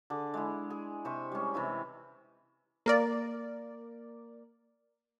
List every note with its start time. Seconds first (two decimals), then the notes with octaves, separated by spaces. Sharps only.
0.10 D3 G#4 D6
0.34 G#3 E4
0.70 G#4
1.05 C3 C5 B5 C#6
1.32 G3 G#3 C#4
1.54 C3 E3 E4 G#5
2.86 A#3 A#4 D5